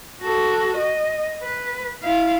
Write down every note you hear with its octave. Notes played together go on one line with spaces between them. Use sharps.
F#4 A4
D#5
B4
E4 F5